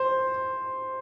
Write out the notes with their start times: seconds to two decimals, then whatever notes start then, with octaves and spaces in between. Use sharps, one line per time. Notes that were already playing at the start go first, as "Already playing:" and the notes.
Already playing: C5